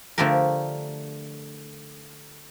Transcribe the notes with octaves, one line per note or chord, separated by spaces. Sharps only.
D3 F3 A3 F4 G4 A#4